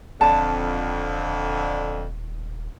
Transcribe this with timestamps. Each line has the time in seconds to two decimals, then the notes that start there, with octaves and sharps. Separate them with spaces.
0.21 D#1 F2 D3 A5